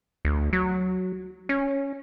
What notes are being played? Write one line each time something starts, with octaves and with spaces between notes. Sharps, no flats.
D2
F#3
C#4